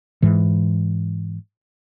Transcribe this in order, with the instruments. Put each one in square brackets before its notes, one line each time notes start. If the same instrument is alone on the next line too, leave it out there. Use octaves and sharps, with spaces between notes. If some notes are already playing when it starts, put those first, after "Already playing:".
[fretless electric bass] G#2 E3